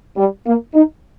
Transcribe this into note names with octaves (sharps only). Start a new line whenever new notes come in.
G3
A#3
D#4